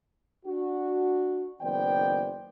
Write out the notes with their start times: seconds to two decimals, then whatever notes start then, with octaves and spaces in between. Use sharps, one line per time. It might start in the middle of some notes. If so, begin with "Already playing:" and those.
0.46 D4 F#4
1.61 F#1 D#3 B3 C5 D5 G5